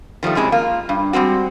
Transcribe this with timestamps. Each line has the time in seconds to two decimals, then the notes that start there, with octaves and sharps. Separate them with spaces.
0.23 D#3 F3 G3 A3
0.35 F#2 C3 G#3 E4
0.52 A#3 F4
0.89 G2
1.13 G3 G#3 C4 F#4